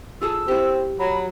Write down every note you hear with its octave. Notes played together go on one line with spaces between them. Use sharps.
F4 G#4 A4 E6
C4 E4 G4
F#3 B5